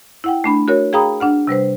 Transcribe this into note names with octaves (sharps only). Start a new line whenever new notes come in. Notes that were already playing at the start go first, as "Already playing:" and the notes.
E4 F#5 G5
A3 D4 B5
F#4 A#4 C#5
G#4 F5 G5 A#5 B5 D#6
D4 F#5 F6
C3 G3 B4 C5